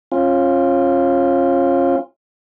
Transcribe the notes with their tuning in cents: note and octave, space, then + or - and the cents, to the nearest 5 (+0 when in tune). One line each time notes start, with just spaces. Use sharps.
C#4 -35 F4 +0